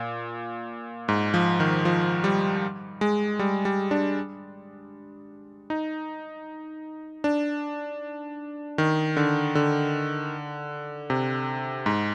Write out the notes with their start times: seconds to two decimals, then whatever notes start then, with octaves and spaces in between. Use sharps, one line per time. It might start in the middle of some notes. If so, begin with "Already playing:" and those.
Already playing: A#2
1.08 G#2
1.34 F3
1.60 D#3
1.85 F3
2.24 G3
3.01 G#3
3.39 G3
3.65 G3
3.91 D4
5.70 D#4
7.24 D4
8.78 D#3
9.17 D3
9.55 D3
11.10 C3
11.86 G#2